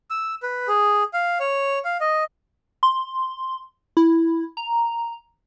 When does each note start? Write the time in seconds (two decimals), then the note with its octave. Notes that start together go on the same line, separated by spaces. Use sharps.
0.10 E6
0.43 B4
0.68 G#4
1.13 F5
1.40 C#5
1.85 F5
2.01 D#5
2.83 C6
3.97 E4
4.57 A#5